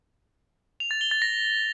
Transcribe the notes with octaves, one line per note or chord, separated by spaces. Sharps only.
F7
A6
G7
A6
A#6